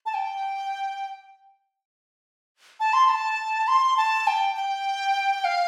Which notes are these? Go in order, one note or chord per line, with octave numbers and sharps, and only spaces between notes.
A5
G5
A5
C6
C6
A5
C6
A5
G5
G5
F5